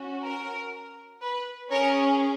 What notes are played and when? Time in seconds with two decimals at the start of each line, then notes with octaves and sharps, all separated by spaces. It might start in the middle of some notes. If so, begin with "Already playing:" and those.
Already playing: C#4 F#4
0.25 A#4
1.22 B4
1.70 C#4 G#4 A#4 C#5